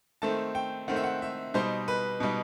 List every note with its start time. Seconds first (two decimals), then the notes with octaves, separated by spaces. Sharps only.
0.22 D#3 A3 C4 A5
0.55 G5
0.88 D#3 A3 C4 F#5
0.96 E5
1.04 F#5
1.22 E5
1.54 B2 G3 D#4 C5
1.88 B4
2.20 B2 G3 D#4